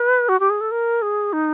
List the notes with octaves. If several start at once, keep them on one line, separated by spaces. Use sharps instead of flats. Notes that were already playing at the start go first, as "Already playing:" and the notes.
Already playing: B4
F#4
G4
G#4
A4
A#4
G#4
D#4